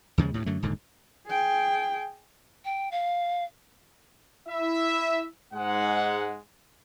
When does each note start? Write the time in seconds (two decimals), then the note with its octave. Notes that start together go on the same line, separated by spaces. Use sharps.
0.18 D#2 C#3 F3 G#3
0.34 D2 A2
0.46 F#2 D3 A3
0.63 D#1 G#2 D3
1.27 G#4 G5
2.64 G5
2.91 F5
4.49 E4 E5
5.54 G#2 G#3 F#5